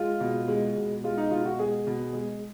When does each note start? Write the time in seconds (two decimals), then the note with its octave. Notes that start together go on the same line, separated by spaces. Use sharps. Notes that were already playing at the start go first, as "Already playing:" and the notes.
Already playing: G#3 F4
0.20 B2
0.48 G#3
0.76 B2
1.04 G#3 F4
1.18 D#4
1.31 B2 F4
1.45 F#4
1.59 G#3 G#4
1.87 B2
2.13 G#3